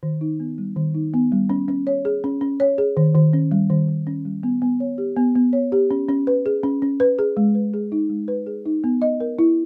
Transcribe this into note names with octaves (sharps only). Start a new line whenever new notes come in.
D#3
D#4
B3
G3
D#3
D#4
B3
G3
C#4
C#4
C#5
G#4
C#4
C#4
C#5
G#4
D#3
D#3
C#4
G3
D#3
D#3
C#4
G3
B3
B3
C#5
G4
B3
B3
C#5
G4
C#4
C#4
B4
G#4
C#4
C#4
B4
G#4
G#3
B4
G#4
D#4
G#3
B4
G#4
D#4
B3
D#5
A#4
E4